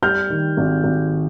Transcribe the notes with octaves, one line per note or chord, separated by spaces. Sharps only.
G3 F6 G6
D#3
G#1
G#1